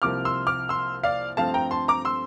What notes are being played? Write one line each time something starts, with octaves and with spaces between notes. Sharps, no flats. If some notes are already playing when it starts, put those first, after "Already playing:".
C2 C3 F3 A#3 D6 F6
C6 E6
D6 F6
C6 E6
D5 F5
G2 F3 A3 C4 F5 A5
G5 A#5
A5 C6
A#5 D6
C6 E6